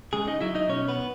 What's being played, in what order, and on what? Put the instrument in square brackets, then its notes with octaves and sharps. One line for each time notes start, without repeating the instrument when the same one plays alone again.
[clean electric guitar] C#3 G#3 G#4
D#4 D#5
F#3 E4 E5
D#4 D#5
B2 C#4 C#5
B3 B4